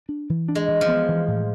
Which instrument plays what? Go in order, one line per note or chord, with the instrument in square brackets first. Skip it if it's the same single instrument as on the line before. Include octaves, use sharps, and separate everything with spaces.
[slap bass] D4
E3
D4
[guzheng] G#3
[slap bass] E3
[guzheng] F3
[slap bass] B3
E3
A2